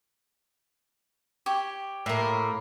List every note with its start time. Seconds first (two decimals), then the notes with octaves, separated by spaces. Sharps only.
1.46 G4 C#5
2.06 A2 A#3